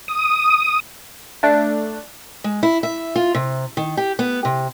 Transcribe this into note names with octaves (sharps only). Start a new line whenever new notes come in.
D#6
A3 D4
G#3
E4
E5
F4
C3
D#3
G4
B3
C3